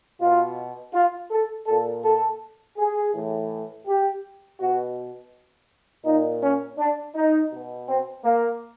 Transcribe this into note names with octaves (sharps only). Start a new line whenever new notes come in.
B2 F4
F4
A4
A#2 A4
A4
G#4
A2 E3
G4
B2 F#4
A#2 D#4
C#4
D4
D#4
B2
C4
A#3